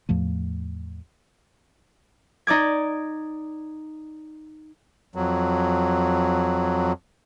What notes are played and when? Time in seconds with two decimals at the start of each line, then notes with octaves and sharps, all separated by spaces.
0.09 E2 A2 F3 A3
2.47 D#4 D5 D6 G#6
5.15 F2 F#3